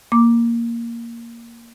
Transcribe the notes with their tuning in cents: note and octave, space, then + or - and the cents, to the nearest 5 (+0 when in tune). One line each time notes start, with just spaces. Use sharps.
A#3 +0 D6 +0